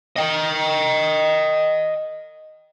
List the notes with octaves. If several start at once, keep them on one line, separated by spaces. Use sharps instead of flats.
D#5 G5